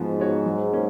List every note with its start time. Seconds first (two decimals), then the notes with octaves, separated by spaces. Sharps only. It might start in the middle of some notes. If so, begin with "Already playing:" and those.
Already playing: G#2 F3 B3 F#4
0.19 B3 F#4 C#5
0.46 F#3
0.73 A#3 C#4